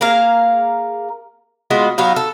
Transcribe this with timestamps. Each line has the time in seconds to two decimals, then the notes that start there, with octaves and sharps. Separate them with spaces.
0.01 A#3 G#4 A#4 F5
1.70 G#3 B3 F4 F#4
1.98 F#3 B3 D#4 F5
2.16 A4